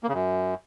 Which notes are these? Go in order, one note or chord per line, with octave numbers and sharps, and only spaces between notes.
A#3
C#3
F#2